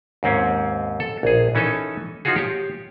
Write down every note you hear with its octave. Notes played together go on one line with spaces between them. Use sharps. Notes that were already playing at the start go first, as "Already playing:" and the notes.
D#2 G#2 C4 C#4
A4
A#1 G#4
E3 C#4 D#4 A4
F3 D#4 F4 F#4 G#4
G4 C#5